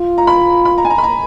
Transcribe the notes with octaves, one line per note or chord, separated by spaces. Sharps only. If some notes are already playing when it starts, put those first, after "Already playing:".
Already playing: F4
A#5
B5
B5
A#5
G#5
A#5
B5
A#5